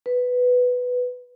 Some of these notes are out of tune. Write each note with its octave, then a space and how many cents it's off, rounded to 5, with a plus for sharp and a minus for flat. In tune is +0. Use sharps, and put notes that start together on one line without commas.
B4 +5